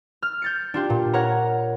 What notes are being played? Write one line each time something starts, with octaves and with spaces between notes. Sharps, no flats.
F6
G6 A6 C#7
D4 F4 G4
A#2
A#4 C#5 F#5 A#5